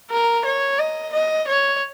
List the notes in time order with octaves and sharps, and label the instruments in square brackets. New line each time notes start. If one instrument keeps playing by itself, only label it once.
[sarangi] A#4
C#5
D#5
D#5
C#5